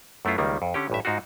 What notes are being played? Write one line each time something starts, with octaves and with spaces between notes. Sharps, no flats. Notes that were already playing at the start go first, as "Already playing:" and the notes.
F#2 A3 B3 E4 F4
C#2 D#3 G3 A#3
F2
D3 C#4 G4
A1 G2 E5
G#2 D#4 F4 F#4